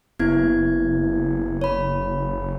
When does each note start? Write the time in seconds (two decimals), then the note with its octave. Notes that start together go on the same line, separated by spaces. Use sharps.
0.19 F#1 B3 E4 G#6
1.62 C#5 B5